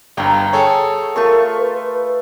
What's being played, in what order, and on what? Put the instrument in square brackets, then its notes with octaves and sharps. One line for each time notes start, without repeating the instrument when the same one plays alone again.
[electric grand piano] G1 G2 [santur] F5 G5 A#5
[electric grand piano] G#4 A4 C#5
[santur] A3 F4 C#6 [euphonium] A#4
[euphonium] B4